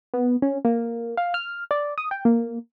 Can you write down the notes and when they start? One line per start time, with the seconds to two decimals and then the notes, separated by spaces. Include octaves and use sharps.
0.14 B3
0.42 C#4
0.65 A#3
1.17 F5
1.34 F6
1.71 D5
1.98 D#6
2.11 G5
2.25 A#3